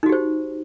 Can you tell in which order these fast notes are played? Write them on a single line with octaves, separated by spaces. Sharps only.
D#4 F#4 G4 C5